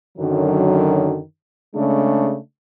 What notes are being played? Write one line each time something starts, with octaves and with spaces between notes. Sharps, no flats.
F#2 D3 D#3 F#3
C#3 G#3 A3 D4